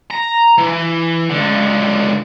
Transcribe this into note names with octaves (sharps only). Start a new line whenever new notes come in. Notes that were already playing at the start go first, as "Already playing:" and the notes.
A#5
E3
C#2 D3